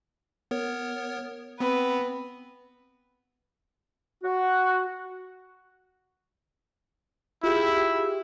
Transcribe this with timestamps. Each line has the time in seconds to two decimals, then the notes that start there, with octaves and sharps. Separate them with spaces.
0.51 B3 A#4 C#5
1.60 B3 C4 B4
4.24 F#4
7.43 E4 F4 G4 G#4